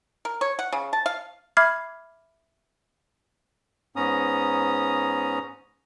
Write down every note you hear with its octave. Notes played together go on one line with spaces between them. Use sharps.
A#4
C#5
F#5
C#3
A5
F5
E5 B5 D6 F6 G#6 C7
G#2 B3 C#4 A#5 D#6